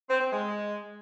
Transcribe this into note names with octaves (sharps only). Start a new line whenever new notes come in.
C4
C4
G#3